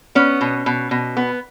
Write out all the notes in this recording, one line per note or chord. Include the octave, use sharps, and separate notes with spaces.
B3 C#4
B2
B2
B2
B3